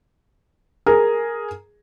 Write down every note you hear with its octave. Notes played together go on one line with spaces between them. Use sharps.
G#4 A#4